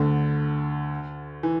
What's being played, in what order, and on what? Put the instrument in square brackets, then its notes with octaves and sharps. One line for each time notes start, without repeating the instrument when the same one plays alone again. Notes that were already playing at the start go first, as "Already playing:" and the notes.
Already playing: [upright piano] D2 D3
E3